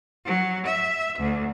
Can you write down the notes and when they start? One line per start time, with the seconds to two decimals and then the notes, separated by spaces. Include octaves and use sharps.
0.25 F#3
0.66 E5
1.19 D2